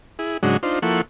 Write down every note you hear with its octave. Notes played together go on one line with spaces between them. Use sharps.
E4 G#4
G#2 C#3 F#3 G#3 D4 F#4
D4 D#4 F4 C5
F3 A#3 E4 A4 F#5 C#6